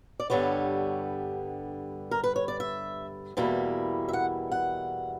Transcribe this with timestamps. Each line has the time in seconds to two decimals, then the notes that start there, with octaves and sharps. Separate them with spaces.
0.20 D5
0.30 G2 D3 G3 B3 C#5
2.11 A#4
2.24 B4
2.36 C#5
2.48 D5
2.60 E5
3.37 E2 B2 G3 A#3 E4
4.09 E5
4.13 F#5
4.52 F#5